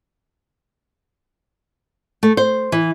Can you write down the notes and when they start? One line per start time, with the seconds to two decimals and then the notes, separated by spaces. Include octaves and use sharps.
2.23 A3
2.37 C5
2.72 E3